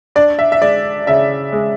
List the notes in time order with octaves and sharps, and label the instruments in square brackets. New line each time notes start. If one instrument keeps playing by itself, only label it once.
[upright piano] D4 D5
E5
E5
G#3 D5
C#3 E5
G#3